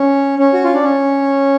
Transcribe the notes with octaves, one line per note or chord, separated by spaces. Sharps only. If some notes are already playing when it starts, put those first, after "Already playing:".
Already playing: C#4
C#4
F#4
F4
D4
C#4